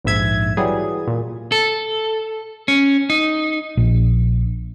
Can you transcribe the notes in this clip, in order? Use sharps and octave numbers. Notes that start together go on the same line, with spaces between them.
A#1 D#2 G#2 E5 G#6
E3 F#3 G3 G#4
A#2
A4
C#4
D#4
A#1